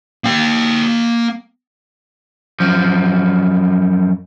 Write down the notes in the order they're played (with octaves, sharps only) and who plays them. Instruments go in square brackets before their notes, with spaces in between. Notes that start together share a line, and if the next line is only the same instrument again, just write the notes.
[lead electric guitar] A#3 G5
[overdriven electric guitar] F#2 F3